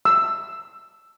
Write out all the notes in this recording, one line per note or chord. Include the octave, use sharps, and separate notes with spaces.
E6